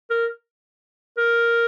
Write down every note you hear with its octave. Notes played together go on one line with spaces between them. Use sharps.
A#4
A#4